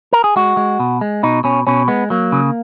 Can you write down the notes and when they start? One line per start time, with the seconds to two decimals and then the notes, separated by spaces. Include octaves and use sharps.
0.13 A#4
0.24 G#4
0.36 G#3 F#4
0.57 G#3
0.79 B2
1.01 G#3
1.23 B2 D#4
1.44 B2 C#4
1.67 B2 C#4
1.88 G#3 B3
2.10 F#3 A#3
2.32 C#3